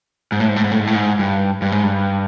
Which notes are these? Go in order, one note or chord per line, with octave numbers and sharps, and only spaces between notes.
G#2
A2
G#2
A2
G#2
A2
G#2
A2
G#2
G2
G2
G#2
G2